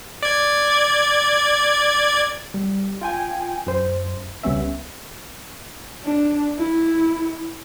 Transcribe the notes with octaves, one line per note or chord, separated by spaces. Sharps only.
D5 G#6
G3
F4 G5 G#5
F#2 C5
C#2 G3 B3 C#4 E5
D4
E4